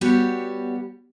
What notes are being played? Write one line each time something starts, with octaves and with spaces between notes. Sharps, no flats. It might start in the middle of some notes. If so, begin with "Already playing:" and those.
G3 B3 F#4 G4 C#5